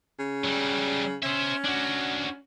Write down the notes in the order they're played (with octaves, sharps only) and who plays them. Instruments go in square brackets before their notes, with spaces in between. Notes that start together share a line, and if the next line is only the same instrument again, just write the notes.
[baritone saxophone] C#3
[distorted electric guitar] F#3 G3
[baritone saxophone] C#4 [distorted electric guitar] C5 E5
[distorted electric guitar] D4 F#4